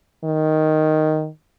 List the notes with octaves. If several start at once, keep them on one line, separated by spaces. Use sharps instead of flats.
D#3